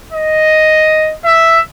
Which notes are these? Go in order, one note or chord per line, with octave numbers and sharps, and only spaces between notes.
D#5
E5